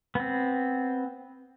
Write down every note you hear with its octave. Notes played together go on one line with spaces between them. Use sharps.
B3 C4